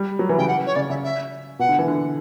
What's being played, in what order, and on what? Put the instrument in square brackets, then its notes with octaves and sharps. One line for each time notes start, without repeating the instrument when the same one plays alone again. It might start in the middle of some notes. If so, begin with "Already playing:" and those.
Already playing: [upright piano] G3
F#3
E3
[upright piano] C#3 [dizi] G5
[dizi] F#5
C#5
[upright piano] C#3 [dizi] D5
[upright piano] C#3 [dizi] E5
[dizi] E5
[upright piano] B2 [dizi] F#5
[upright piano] D3
E3
D3